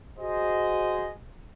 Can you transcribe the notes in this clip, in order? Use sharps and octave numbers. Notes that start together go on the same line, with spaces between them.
F#4 G#4 C5 D#5